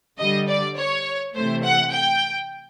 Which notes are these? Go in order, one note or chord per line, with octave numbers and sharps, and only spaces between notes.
D3 G3 D#5
D5
C#5
C3 E3 A3 C5
F#5
G5